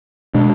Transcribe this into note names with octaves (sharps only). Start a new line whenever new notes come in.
B2 G#3 D4